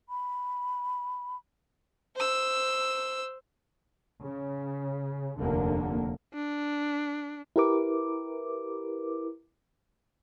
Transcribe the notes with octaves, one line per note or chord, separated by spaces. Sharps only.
B5
C5 E6
C#3
F1 D#2 D3 A#3
D4
E4 G4 A#4 B4 D6